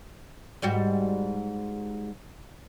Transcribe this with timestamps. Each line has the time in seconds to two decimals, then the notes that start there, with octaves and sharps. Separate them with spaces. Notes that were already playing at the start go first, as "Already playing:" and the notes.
0.62 G#2 G3 F#4